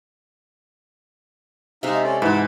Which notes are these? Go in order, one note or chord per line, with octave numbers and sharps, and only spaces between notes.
C3 G#3 D#4 E5 F5
C#4 A4 D5
G#2 E3 F#5 A5 B5